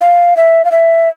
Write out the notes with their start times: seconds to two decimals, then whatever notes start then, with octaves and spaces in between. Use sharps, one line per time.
0.01 F5
0.37 E5
0.65 F5
0.72 E5